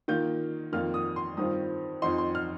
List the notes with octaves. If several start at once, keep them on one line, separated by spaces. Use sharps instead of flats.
D#3 A#3 F4 G6
F2 D#3 A#3 F4 F6
D#6
C6
G2 D#3 C4 F4 D#6
F2 F3 D#4 C6
C6
F6